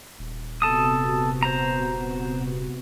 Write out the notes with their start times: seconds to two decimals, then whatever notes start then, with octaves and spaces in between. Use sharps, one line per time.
0.19 D#1
0.62 C3 B3 F#4 A4 A5 D#6
1.43 C5 A#5